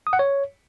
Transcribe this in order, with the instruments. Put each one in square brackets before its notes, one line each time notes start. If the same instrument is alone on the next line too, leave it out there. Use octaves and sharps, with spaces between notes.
[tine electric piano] D#6
F#5
C#5